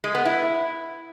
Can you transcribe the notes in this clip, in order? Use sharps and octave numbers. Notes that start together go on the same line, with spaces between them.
G#3
B3
E4